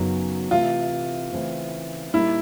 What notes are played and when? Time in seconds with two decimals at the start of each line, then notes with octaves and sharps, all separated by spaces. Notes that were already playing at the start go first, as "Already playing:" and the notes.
Already playing: F#2 C#3 F#3 B3 D#4
0.51 C3 E3 A3 F4
1.32 C#3 E3 A3 C4
2.13 A#2 G3 A#3 D#4 E4